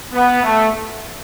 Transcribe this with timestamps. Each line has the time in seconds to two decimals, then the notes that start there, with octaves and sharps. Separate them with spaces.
0.13 B3
0.42 A3